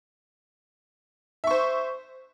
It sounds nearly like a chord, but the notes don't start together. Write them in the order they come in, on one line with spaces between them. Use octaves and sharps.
E5 C#6 C5